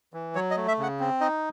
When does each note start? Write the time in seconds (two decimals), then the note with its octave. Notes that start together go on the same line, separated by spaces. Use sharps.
0.13 E3
0.35 F#3 C#5
0.51 D#5
0.57 A3
0.68 E5
0.79 C#3 F#5
1.00 C4
1.21 D#4 D#5